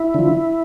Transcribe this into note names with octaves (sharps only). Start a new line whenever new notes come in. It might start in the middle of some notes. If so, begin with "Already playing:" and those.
Already playing: E4
D3 F3